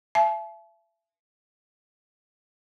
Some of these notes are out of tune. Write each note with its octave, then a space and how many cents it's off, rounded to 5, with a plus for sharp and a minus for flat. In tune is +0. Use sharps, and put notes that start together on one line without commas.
E5 +35 A5 -40